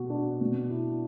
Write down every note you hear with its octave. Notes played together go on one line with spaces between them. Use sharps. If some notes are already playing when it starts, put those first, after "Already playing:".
Already playing: B2 F#4
D4
B2
E4